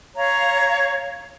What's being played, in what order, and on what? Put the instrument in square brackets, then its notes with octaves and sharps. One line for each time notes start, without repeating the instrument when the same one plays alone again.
[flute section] C#5 F5 A#5